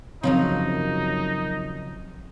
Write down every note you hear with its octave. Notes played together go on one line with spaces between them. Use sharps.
F#2 C#3 F3 F#3 C4 D#4